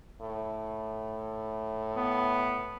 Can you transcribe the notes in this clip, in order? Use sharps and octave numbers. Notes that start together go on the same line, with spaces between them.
A2
B3